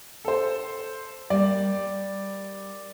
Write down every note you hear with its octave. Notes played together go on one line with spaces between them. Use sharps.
A4 C5
G3 A#3 D5